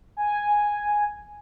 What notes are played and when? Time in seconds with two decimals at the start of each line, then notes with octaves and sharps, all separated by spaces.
0.17 G#5